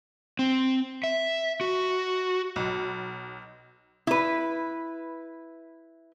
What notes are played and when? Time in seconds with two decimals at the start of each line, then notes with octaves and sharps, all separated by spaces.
0.39 C4
1.04 E5
1.61 F#4
2.56 B1
4.07 E4 B4